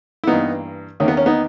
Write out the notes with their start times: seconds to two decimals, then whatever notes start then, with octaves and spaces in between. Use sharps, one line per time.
0.24 E4
0.27 G2 E3 A#3 B3 D#4
1.00 E2 D#3 A#3 C#4
1.08 B3
1.17 C#4
1.26 B3 D#4